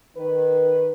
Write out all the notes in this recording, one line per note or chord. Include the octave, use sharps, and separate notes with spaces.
D#3 B4